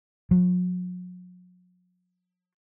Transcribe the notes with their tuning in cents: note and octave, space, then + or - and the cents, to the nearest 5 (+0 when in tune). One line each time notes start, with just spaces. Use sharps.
F#3 -40